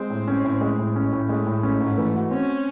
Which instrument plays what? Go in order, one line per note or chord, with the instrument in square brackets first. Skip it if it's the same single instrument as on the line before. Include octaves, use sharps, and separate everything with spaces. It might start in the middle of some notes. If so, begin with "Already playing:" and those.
Already playing: [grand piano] G#3 [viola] C4
[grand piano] A2
C#4
A2
G#3
A2
C#4
A2
[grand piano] G#3 [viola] A3
[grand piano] A2
C#4
[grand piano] G#2 [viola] A3
[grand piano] E3
F#4
[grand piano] C4 [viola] C#4